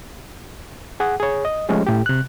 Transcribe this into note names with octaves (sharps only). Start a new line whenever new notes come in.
G#4 F#5
G#4 C#5
D#5
F3 G#3 A3 C#4 G4
A2 G4
C3 F#6